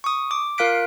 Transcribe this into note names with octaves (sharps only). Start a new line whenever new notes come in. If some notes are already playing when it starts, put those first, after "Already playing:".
C#6 D#6
D6
F4 A#4 F5 F#6 B6 D7